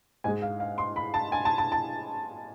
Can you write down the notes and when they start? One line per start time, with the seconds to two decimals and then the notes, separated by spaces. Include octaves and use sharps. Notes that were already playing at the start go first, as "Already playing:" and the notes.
0.24 G#2 G#3 G#5
0.42 F5
0.60 F5
0.78 C6
0.96 B5
1.14 A5
1.32 G#5
1.45 A5
1.58 A5
1.72 A5